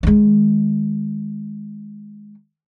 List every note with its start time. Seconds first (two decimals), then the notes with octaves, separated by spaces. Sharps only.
0.03 D#3 G#3